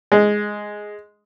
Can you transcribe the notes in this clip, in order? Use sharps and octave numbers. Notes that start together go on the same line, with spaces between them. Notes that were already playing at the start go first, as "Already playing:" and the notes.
G#3